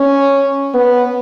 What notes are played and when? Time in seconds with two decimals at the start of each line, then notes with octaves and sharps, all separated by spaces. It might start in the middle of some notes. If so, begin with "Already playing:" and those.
Already playing: C#4
0.74 B3